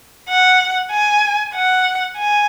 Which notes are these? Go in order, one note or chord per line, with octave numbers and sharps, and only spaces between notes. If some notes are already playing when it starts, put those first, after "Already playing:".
F#5
G#5
F#5
G#5